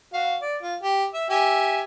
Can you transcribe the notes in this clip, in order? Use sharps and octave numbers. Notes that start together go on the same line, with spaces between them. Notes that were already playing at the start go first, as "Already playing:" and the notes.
F#4 F5
D5
F4
G4
E5
G4 E5 G#5